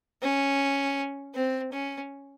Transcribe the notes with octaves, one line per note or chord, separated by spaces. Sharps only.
C#4
C4
C#4